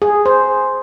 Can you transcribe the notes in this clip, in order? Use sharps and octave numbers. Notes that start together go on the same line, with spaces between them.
G#4
C5